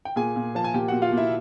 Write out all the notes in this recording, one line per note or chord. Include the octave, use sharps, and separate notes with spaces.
G5
A#2 G#4 G#5
A#2
F3 A5
G#5
A#2 G4 G5
A#2 F#4 F#5
F4 F5
A#2 E4 E5